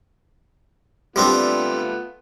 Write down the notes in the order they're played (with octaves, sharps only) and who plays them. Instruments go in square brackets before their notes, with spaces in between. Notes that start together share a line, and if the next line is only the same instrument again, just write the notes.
[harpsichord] G3 C4 D4 [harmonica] A3 B3 F4